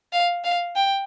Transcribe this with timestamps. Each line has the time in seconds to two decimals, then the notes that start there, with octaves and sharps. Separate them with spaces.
0.13 F5
0.44 F5
0.76 G5